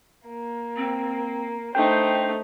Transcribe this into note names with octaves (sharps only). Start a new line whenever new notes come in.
A#3
C4
A3 D4 D#4 C5 G5